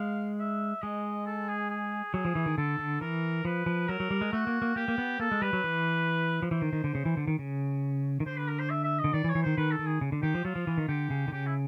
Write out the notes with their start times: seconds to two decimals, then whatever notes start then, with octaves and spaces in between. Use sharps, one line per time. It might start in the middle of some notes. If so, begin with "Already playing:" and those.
Already playing: G#3 F5
0.39 E5
0.82 G#3 D#5
1.26 A4
1.48 G#4
1.70 G#4
2.14 F#3 G#4
2.25 F3
2.35 E3
2.46 D#3
2.58 D3 A4
2.79 D3
3.01 E3 A#4
3.45 F3 B4
3.66 F3
3.88 F#3 A#4
4.00 F#3
4.11 G3
4.21 G#3
4.32 A3 F#4
4.47 A#3
4.62 A#3
4.76 A#3 G4
4.88 A#3
4.98 B3
5.20 A#3 A4
5.31 G#3
5.42 G3 B4
5.53 F#3
5.64 E3
6.42 F3
6.51 E3 C5
6.62 D#3
6.73 D#3
6.84 D3
6.95 C#3
7.05 E3
7.17 D3
7.27 D#3
7.39 C#3
8.20 D#3
8.26 D3 C5
8.37 B4
8.48 A#4
8.59 C5
8.70 E5
8.84 E5
8.99 D#5
9.04 D3
9.14 D#3 D5
9.24 E3
9.29 C#5
9.35 E3
9.43 D#3 C5
9.58 D#3 B4
9.72 A4
9.79 D#3
9.86 G#4
10.01 C#3
10.12 D3
10.22 D#3 G4
10.34 F3
10.45 F#3 F4
10.56 F3
10.67 E3
10.78 D#3
10.88 D3 G4
11.10 C#3
11.28 D3
11.32 C#3 G4
11.46 E4